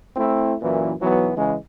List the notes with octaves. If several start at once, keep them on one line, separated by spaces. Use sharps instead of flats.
A3 C4 E4
F#2 A#2 E3
B1 E3 F#3 B3
C#3 E3 G#3